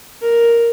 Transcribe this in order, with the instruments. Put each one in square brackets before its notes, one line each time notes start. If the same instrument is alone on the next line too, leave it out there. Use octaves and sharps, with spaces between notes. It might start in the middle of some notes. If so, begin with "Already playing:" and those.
[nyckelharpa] A#4